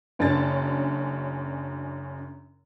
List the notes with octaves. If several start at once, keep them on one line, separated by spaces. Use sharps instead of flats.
F#1 F#2 C#4 D4 A5 A6